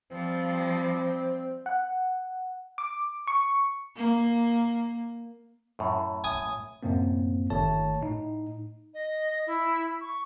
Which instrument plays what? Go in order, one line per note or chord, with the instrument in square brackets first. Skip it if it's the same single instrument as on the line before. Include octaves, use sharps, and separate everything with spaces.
[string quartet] F3 G3 [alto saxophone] C4
[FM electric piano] F#5
D6
C#6
[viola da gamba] A#3
[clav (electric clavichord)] F#2 A2
[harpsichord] G#5 D#6
[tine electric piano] F#2 A2 C3 A#3 C4
G1 D#3 A3 C#5 A5
A2 D#4
[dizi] D#5
E4
C#6